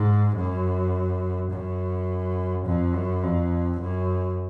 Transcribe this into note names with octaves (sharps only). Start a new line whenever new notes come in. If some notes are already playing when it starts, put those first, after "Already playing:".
Already playing: G#2
F#2
F#2
F2
F#2
F2
F#2